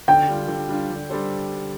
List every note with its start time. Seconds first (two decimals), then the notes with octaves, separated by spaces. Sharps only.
0.08 D3 G5
0.28 G3 D4 F4
0.48 D3
0.69 G3 D4 F4
0.90 D3
1.10 G3 D4 A4 C5